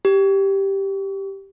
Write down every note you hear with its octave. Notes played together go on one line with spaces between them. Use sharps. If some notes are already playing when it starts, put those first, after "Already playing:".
G4